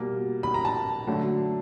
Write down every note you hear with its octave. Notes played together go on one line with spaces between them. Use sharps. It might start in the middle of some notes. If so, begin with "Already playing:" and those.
Already playing: B2 G3 A#3
B5
A#5
A5
D3 F#3 A3